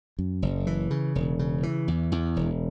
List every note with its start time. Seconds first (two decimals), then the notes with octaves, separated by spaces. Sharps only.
0.19 F#2
0.42 F#1
0.67 E3
0.91 C#3
1.15 E1
1.39 C#3
1.63 E3
1.88 E2
2.12 E2
2.36 E1